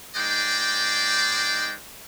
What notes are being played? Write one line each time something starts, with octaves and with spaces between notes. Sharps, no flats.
G#3 D#4 C5 D5 G5